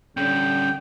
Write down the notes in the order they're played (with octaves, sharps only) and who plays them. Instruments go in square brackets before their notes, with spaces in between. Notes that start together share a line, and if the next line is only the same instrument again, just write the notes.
[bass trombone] D3 [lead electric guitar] G3 C#4 [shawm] G5